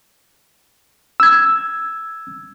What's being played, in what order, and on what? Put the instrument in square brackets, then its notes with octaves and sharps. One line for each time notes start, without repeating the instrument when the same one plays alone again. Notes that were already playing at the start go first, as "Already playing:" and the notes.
[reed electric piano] E6 G#6